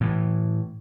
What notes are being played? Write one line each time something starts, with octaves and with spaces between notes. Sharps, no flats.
A2 E3